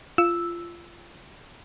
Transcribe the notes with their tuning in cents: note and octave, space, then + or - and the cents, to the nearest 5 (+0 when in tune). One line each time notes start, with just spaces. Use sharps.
F4 -20 E6 +0